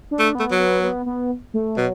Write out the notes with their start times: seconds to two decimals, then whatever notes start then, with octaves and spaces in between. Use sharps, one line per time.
0.11 D4
0.19 A3
0.35 A3 B3
0.51 F#3
0.59 B3
0.83 B3
1.06 B3
1.54 A3
1.77 B2 F#3